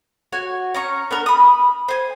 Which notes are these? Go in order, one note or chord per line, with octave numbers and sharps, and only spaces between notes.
F#4 C#5 G#5
C#4 A#5 C#6
B3 D4 A#4
B5 D#6
C5 G#5